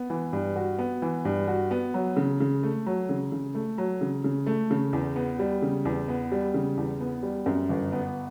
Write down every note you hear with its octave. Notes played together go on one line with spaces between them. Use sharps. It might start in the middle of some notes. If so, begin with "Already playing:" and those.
Already playing: B3
E3
G2
F#4
B3
E3
G2
F#4
B3
F#3
C#3
C#3
A3
F#3
C#3
C#3
A3
F#3
C#3
C#3
A3
C#3
E2
B3
G3
C#3
E2
B3
G3
C#3
E2
B3
G3
F#2
G1
B3